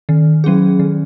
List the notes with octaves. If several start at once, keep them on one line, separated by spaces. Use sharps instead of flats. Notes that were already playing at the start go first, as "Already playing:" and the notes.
D#3
F#3 C#4 G#4
D#3